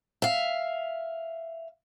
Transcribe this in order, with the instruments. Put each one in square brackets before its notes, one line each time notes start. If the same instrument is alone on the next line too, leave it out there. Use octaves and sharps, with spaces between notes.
[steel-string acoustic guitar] E5 F5